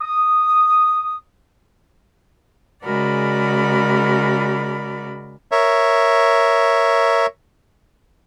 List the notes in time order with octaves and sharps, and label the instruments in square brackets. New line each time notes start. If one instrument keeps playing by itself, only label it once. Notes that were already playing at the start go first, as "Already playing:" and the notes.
[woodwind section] D#6
[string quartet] C#3 G#3 F#4 A#4 D5 B5
[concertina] A#4 C#5 E5